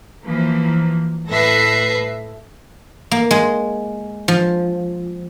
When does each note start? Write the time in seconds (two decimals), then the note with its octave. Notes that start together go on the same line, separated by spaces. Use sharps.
0.25 E3 F3 A#3
1.28 A2 A4 B4 E5 A#6 C7
3.11 A#3
3.31 G#3
4.28 F3